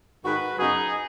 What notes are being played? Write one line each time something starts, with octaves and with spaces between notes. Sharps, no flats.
G#2 D#3 G#3 F#4 B4
F#2 C#3 F#3 B3 D#4 G#4